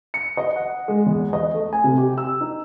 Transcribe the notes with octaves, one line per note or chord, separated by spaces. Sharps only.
C#7
D#5
F#5
G#3
E2
D#5
A3
G#5
C3
G4
E6
D#4